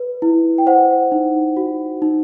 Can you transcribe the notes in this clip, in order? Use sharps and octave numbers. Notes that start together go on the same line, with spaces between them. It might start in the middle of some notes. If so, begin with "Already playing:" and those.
Already playing: B4
E4
G5
C5 F#5
D#4
F#4
D#4